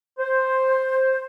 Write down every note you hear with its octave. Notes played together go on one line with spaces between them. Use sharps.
C5